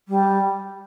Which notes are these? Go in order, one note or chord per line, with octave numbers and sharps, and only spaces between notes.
G3